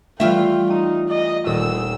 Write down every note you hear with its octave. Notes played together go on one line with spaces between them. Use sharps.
E3 G3 A3 F4 E5 G5
D#4 D#6
D#5
D#1 A4 D#6 E6